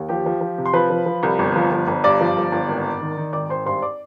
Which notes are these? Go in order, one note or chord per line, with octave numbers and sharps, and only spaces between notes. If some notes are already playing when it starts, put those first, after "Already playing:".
Already playing: D#2
F3 G4 G5
F3
F3
C3
C6
F3 B4 B5
F3
F3
C2
G1
F3
G1
G1
G2 D5 D6
F3
G1
G1
G#1
G#1
D#3
D#3
G#1 D5 D6
G#1 C5 C6
G2 C5 C6
D5 D6